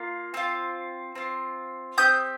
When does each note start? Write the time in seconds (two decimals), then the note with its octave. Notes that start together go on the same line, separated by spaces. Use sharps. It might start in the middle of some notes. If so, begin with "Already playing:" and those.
Already playing: A#3 F4
0.34 C4 F4
1.15 C4 F4
1.98 C4 G4 D#6 G6